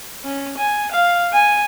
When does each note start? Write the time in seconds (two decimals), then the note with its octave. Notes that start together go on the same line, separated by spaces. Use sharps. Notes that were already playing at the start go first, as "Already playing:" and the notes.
0.24 C#4
0.58 G#5
0.92 F5
1.33 G#5